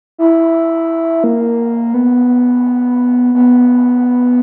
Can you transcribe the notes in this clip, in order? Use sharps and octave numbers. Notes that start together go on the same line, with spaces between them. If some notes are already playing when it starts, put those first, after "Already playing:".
E4
A#3
B3
B3